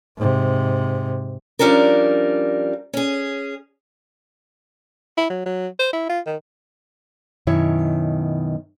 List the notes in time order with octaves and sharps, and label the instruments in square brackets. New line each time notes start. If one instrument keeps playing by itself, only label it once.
[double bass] G#2 C3
[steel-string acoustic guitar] F3 G3 C#4 D4 A#4
C#4 G#4
[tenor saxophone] E4
F#3
F#3
C5
E4
F4
D#3
[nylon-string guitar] F#2 B2 D#3 E4 C#5